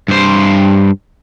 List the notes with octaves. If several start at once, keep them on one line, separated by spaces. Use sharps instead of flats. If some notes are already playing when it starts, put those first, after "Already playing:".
G2 C5